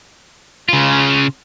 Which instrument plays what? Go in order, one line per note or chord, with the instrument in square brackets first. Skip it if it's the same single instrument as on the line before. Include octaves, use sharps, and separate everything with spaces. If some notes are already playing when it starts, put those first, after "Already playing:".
[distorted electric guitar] C#3 F4